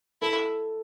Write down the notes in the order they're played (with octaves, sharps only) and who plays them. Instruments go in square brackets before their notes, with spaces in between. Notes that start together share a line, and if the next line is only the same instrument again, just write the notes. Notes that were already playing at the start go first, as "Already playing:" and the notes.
[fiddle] E4 [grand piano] A4